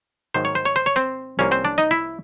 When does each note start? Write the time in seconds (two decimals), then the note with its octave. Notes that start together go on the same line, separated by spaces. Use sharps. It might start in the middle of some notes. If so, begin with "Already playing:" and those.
0.34 G#2 D#3 F#3 A#3 C5
0.45 C#5
0.55 C5
0.65 C#5
0.76 C5
0.86 C#5
0.96 C4 C5
1.39 C2 C3 F3 A#3 C#4 C#5
1.51 C4 C5
1.65 D4 D5
1.78 D#4 D#5
1.91 E4 E5